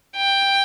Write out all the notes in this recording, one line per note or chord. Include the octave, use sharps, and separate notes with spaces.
G5